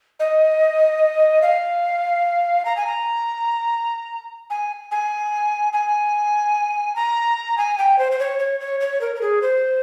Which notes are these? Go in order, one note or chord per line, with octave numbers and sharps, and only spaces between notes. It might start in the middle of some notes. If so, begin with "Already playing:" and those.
D#5
F5
A#5
G#5
A#5
G#5
G#5
G#5
A#5
G#5
G5
C5
C5
C#5
C#5
C#5
C#5
A#4
A#4
G#4
C5